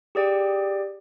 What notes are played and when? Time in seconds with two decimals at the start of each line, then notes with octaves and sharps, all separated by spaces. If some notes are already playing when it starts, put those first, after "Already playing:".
0.15 G4 G#4 D5 G5